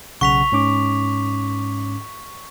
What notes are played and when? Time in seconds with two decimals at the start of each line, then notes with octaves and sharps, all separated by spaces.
0.21 B1 C#3 F#5 C#6 B6 F7
0.52 G#2 C#4 D6